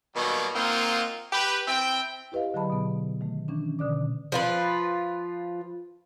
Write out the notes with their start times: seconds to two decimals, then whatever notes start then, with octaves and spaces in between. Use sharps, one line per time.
0.15 B2 D#3 F#3 G3 A#3
0.54 A#3 C4 D#4 F4 F#4
1.31 G4 B4
1.67 C4 E4 G5
2.32 E4 G4 B4 D#5 F5
2.54 D3 F#3 G#4 D#5 A5 B5
2.70 B2 B3
3.21 D#3 A3
3.48 D#3 E3 C#4 D4
3.79 B2 D3 D5 D6
4.32 F3 F4 B4